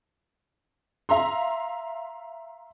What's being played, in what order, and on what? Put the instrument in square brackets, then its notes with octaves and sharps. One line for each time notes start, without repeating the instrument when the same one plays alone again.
[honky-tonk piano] E5 F5 A#5 C6